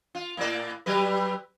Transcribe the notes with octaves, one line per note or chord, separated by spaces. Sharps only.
F4
A2 A#3 D5
F#3 G3 B4